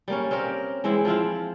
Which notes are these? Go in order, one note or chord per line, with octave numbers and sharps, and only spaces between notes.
G3 A#3 C#4
C4 C#4 G4 A#4
E3 G#3 C4 E4
F3 C4 E4 F4